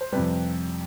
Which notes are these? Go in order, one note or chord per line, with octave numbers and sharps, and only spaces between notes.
C5
F2 C3 G3 B4